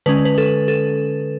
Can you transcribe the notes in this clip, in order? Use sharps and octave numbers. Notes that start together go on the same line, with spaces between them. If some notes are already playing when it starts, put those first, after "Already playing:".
D3 G#3 C#4 B4
B4
A4
A4